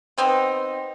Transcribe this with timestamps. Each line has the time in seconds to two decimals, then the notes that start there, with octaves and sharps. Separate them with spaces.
0.18 B3 C4 D#4